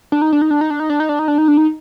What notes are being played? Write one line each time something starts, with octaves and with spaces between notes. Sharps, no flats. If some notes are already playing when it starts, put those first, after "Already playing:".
D4
D#4
D4
D#4
D4
D#4
D4
D#4
D4
D#4
D4
D#4
D4
D#4
D4
D#4